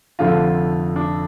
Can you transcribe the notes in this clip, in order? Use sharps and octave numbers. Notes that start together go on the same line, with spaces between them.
F1 F2 D3 F3 A3 F4
D4